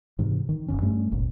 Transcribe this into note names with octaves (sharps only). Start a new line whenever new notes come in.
G#2 C3 D#3 E3
D#3
D#1 A#1 F#2 C#4
G2 G3 A3 C#4
D1 G1 D#2 A#2